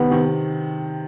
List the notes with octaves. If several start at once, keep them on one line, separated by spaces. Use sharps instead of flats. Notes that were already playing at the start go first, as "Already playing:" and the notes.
Already playing: C3 D#3 B3
C3 D#3